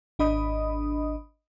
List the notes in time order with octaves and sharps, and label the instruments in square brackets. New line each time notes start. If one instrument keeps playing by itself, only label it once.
[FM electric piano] G#1 D4 D#5 B5 D#6